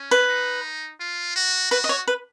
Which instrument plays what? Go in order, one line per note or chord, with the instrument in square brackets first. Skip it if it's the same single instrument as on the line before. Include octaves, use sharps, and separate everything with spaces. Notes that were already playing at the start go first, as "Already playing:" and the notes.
Already playing: [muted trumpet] C#4
[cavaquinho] B4
[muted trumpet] D#4
F4
F#4
[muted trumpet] F#4 [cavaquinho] B4
[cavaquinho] D#5
C#5
B4